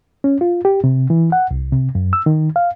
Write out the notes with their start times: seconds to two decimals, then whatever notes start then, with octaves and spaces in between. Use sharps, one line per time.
0.24 C#4
0.41 F4
0.65 G4
0.84 C3
1.10 E3
1.32 F#5
1.51 C2
1.73 C3
1.95 F#2
2.13 E6
2.26 D#3
2.56 F5